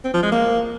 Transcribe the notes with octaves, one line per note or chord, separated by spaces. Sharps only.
C4
F3
G#3
A#3